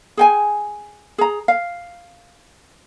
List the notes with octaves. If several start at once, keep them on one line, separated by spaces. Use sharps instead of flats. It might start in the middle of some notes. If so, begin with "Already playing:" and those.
G#4 G5 G#5
G#4 A#5
F5